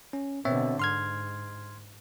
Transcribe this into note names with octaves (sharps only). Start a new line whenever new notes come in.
C#4
B2 D3 C4 C#5 E5
G#2 C6 F6 G#6